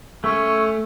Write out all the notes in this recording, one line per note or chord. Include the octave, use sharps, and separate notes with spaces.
A3 C#4